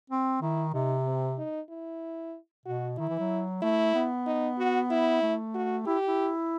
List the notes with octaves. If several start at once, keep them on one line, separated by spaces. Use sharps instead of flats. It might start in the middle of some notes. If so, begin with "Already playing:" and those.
C4
D#3 E4
C3 D#4
C4
D#4
E4
B2 F#4
D#3 E4
E3
F#3
A3 E4
B3
D#4
F#4
E4
A3
F#4
E4 G4
E4